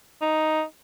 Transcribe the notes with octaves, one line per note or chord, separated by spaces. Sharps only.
D#4